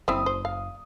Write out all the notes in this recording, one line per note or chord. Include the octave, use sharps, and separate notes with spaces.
F#1 C4 E4 D#6
C5
F5